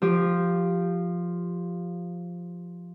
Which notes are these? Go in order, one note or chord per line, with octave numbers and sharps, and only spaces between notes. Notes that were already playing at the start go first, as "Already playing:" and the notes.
F3 G4